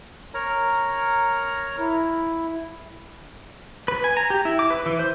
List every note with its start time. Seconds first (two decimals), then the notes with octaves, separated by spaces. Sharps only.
0.34 A#4 C#5 A#5
1.79 E4
3.88 B4
4.04 G#5
4.17 A#5
4.30 G4
4.45 E4
4.59 D6
4.70 B4
4.86 E3
4.99 C5